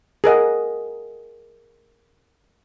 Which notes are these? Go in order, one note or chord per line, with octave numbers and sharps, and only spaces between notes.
G#4 A#4 D#5 F#5